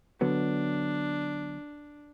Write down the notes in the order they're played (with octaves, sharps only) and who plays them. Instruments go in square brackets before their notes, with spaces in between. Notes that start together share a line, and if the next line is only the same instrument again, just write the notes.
[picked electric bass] D3 F#3 B3 [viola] D4